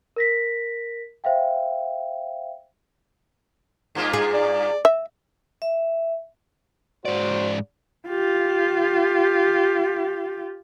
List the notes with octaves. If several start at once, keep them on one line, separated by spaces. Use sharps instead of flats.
A#4 A#6 B6
C5 E5 F5 G5
G2 A#3 F4
G#4
D5
E5
E5
G#2 F#4 C5 D5
F4 G4